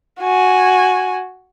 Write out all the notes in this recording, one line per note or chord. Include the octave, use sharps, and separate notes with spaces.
F#4 G#5